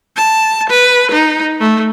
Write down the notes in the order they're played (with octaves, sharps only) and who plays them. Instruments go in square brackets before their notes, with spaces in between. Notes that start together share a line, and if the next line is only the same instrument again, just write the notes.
[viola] A5
B4
D#4
A3